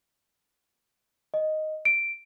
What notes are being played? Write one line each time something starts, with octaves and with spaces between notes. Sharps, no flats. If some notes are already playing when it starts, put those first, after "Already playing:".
D#5
D7